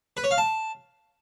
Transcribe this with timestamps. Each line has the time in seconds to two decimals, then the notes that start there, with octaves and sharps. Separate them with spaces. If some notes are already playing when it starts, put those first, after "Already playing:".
0.17 B4
0.24 C#5
0.31 F5
0.38 A5